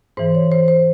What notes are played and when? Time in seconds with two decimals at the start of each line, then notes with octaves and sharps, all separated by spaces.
0.17 G#2 E3 C5
0.35 C#5
0.52 C5
0.68 C5